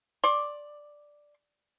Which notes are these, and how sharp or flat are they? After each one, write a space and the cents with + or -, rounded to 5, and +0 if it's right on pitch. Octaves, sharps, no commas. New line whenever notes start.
D5 +0 C6 +35